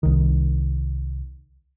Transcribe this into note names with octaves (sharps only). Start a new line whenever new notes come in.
C2 D#3